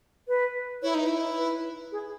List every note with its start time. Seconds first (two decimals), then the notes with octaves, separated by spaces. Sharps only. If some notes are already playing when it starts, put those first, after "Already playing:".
0.28 B4
0.82 E4 C#5
0.94 D#4
1.01 B4
1.06 E4
1.37 B4
1.92 G#4